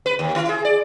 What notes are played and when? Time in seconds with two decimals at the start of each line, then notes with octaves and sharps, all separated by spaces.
0.06 B4
0.19 D#2
0.36 E4
0.49 G#4
0.65 D5